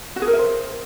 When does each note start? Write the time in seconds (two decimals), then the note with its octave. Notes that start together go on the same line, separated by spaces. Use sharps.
0.16 F#4
0.22 G#4
0.27 A#4
0.33 E5
0.39 C5